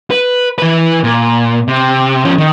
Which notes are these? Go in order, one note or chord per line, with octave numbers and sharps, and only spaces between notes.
B4
E3 B4
A#2
C3
F3 C#4
D#3